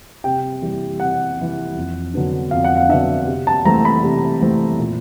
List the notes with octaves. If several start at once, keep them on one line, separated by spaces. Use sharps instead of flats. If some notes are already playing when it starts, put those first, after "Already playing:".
C3 G5
E3 G3
C3 F#5
E3 G3
F2
D3 F#3 B3 D4
F2 F5
F#5
F5
D3 F#3 B3 D4 E5
C3
A5
E3 A3 C4 A#5
B5
C3
E3 A3 C4
A#2